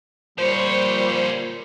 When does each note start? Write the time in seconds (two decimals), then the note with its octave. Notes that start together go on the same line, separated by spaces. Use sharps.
0.38 A#2 F3 G3 C5 C#5